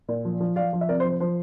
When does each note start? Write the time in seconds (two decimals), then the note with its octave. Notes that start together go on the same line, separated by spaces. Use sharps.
0.09 A#2
0.25 F3
0.40 F3
0.56 F3 D5 F5
0.73 F3
0.81 E5
0.89 C3 A#4 D5
1.00 C5
1.05 F3
1.10 C5
1.20 F3 C5